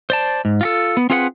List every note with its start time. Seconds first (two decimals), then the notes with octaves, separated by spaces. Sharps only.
0.10 C5 D5 A5
0.45 G#2
0.61 F4 F#4 A4
0.97 B3
1.10 C4 F4 G#4 B4 D#5 F#5